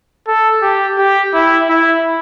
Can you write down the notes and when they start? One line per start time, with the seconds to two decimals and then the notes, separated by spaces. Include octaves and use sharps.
0.28 A4
0.62 G4
0.98 G4
1.33 E4
1.69 E4